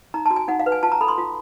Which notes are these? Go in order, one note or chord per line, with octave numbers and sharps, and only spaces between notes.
D#4 A#5
F#4 A5
G#5
D#4 F#5
F5
B4
G#5
F4 A5
A#5
A4 B5
C6
F4